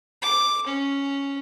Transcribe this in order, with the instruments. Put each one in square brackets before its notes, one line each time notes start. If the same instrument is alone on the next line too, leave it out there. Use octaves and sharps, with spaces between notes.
[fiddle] D6
C#4